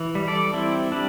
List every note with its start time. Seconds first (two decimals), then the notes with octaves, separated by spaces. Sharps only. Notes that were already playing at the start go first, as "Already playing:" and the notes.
Already playing: E3
0.15 G3
0.28 A4 D5
0.53 C4 E4
0.92 G3 D4